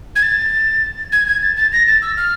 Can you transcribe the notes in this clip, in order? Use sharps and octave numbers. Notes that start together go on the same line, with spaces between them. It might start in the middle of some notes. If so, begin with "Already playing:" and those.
G#6
A6
G#6
G#6
A6
A6
A#6
A6
E6
F6